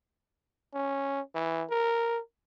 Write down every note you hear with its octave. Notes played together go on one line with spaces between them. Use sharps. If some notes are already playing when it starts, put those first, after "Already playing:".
C#4
E3
A#4